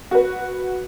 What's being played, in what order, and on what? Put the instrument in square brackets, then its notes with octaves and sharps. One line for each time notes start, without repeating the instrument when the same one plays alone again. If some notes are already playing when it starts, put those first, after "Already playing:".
[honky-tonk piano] F#4 B4